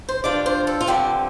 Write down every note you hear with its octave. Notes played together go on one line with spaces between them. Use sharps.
C5
G2 F3 D4 F4 D5
C5
A4
F4
G2 D3 F3 C4 G4